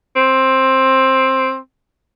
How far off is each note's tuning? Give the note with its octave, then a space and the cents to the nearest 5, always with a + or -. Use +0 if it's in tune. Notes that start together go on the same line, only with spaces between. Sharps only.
C4 +10